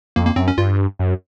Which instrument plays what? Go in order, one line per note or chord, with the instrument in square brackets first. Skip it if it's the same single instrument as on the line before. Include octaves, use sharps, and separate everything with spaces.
[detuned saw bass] F2 [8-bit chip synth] A#3
[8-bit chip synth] A#3
[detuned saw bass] F#2 [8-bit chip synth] C4
[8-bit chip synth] C#4
[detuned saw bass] G2 [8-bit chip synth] F4
[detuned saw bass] F#2